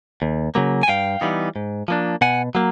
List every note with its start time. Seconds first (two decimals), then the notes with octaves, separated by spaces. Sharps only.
0.22 D#2
0.55 C#3 F#3 A#3
0.83 G#5
0.88 G2 F5 G5
1.21 E3 G3 B3 D#4
1.56 G#2
1.88 F3 A#3 D4
2.21 B2 F#5 G#5
2.55 F#3 A#3